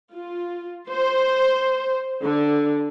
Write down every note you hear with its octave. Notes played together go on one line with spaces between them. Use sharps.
F4
C5
D3